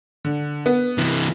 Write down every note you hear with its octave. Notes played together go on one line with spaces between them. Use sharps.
D3
B3
C3 E3